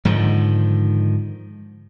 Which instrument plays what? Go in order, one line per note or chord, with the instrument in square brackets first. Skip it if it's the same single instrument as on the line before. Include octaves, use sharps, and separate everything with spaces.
[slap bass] G#2 D3 D#3 F3